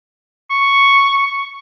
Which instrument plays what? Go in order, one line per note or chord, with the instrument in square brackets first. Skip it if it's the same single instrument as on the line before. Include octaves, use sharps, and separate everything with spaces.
[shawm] C#6